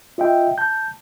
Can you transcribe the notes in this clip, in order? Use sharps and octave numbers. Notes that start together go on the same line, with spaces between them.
F4 D#5 E5 G5
A5 G6